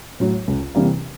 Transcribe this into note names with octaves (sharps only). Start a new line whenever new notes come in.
A2 F#3
C#2
C3 E3 G3 A#3